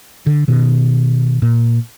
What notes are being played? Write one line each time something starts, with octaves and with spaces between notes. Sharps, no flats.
D3
B2 D#3
A#2